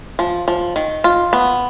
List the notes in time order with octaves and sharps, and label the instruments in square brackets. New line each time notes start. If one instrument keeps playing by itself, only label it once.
[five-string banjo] F3
F3
D#3
F4
B3